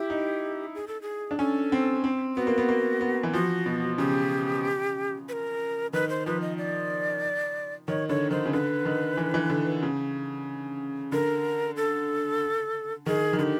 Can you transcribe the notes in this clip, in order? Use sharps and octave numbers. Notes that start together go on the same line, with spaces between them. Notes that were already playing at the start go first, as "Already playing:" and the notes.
Already playing: E4 G4
D#4
G#4
A4
G#4
D4
C#4 A4
C4
C4
B3 F#4
A#3
B3
A#3
B3
E3
F3 F#4
B2
C#3 G4
B4
A#4
D#3 B4
C5
F3 B4
D#5
D5
D#3 C#5
D3 C#5
D#3 C5
C#3
D3 B4
D#3
E3
E3
D3
C#3
D3 A#4
A4
D#3 G#4
D#3
D3 G4 G#4